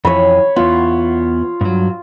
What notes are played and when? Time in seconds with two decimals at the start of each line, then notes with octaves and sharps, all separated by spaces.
0.05 F2 E3 C#5 B5
0.56 E2 B3 F4
1.61 G2 F#3